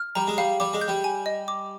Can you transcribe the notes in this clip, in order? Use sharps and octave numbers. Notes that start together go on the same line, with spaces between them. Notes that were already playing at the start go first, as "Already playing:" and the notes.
Already playing: F6
G3 A#5
G#3
G3 F5
G3 D6
G#3
G6
G3
G#5
D#5
D6